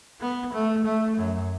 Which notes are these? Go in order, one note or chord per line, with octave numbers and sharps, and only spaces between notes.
B3
A3
A3
F#2